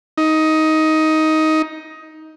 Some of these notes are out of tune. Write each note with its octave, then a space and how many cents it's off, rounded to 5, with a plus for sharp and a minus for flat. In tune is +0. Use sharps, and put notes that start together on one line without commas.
D#4 +15